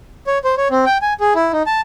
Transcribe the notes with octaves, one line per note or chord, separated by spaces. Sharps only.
C#5
C5
C#5
C4
G5
G#5
G#4
E4
D#4
A5